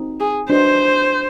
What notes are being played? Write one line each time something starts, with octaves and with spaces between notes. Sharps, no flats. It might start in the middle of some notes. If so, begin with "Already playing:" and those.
Already playing: C4 D#4 F#4
G#4
D4 F#4 B4 C5 D#5